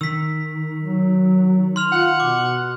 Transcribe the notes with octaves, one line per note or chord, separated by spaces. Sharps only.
D#3 E6 B6
F#3
C6 F6 F7
F4 F#5
B2 D6